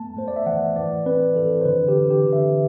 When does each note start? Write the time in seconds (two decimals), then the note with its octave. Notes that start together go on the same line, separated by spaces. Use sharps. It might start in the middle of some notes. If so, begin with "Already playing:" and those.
Already playing: A3 B3 A5
0.17 A3 C5
0.28 D5
0.36 E5
0.46 E3 F#5
0.76 E3 D5
1.06 C4 B4
1.35 E3 A4
1.61 C5
1.65 D3 B4
1.88 G4
1.95 D3
2.10 G4
2.26 D3
2.33 E5